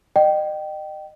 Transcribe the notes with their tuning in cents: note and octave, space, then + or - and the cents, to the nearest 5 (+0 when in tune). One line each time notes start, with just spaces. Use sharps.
D#5 -35 G5 -20